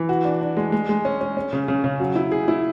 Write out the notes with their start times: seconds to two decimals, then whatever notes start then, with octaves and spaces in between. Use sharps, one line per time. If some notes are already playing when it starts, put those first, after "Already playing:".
Already playing: E3
0.09 F#4
0.25 D4
0.41 D4
0.57 G#3
0.72 G#3
0.89 G#3
1.05 C#4
1.21 C#4
1.37 C#4
1.53 C#3
1.68 C#3
1.84 C#3
2.00 F#3
2.16 E4
2.32 G#4
2.48 E4